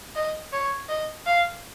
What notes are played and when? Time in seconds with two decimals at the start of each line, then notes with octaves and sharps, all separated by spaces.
0.15 D#5
0.52 C#5
0.89 D#5
1.26 F5